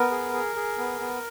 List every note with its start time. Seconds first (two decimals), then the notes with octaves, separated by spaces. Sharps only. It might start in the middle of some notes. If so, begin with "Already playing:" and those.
Already playing: B3 A#4
0.11 G#4
0.33 G#4
0.56 G#4
0.78 B3
1.00 B3